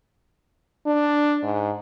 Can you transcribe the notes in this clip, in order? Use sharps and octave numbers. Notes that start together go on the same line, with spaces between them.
D4
G#2